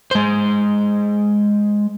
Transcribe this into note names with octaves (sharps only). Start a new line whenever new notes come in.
G#3 C5